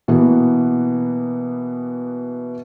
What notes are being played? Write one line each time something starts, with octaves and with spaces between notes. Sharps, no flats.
B2 E3 A#3 B3